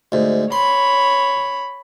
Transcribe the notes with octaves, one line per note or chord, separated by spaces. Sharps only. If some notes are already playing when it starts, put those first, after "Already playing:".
D2 G#2
C#5 B5 C6